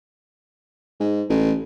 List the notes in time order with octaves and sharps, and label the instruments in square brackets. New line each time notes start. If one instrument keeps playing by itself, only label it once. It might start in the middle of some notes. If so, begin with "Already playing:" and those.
[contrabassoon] G#2
A1